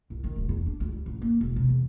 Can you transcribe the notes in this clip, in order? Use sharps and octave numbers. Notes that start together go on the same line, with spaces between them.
C2
D#3
D1
E2
D4
D2
G3
A1
A#3
E1
C3
E2